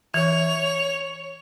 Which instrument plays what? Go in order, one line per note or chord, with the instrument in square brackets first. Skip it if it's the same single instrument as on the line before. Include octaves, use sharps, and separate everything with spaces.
[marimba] E3 [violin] C#5 F7